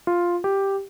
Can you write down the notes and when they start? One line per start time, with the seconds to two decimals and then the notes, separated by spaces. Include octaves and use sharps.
0.07 F4
0.44 G4